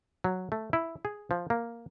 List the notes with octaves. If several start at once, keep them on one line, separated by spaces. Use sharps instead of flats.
F#3
A3
E4
G#4
F3
A#3